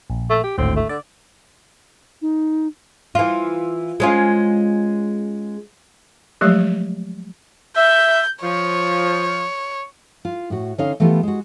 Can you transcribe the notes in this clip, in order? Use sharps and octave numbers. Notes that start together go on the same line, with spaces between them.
A#1
A3
G4
G#1 D2 A2 C4
A3
D3 D5
D#4
E3 F4
G#3 C#4 F4
F3 F#3 G#3 A3 G4
E5 G6
F3 C#5
F4
A2 F#4
D3 C#4 D#4 C#5 D#5 F5
E3 A3 B3 E4 F4 G4
G#3 F#4